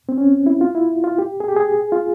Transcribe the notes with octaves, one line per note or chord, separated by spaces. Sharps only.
C4
C#4
E4
F4
E4
F4
G4
G#4
G4
G#4
F4